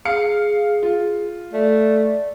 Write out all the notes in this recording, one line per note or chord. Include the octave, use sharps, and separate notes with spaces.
G#4 F5 C#7
F4
A3 D5